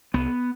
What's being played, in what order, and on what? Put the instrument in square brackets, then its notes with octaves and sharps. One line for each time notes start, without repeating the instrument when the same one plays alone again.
[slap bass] C2 B3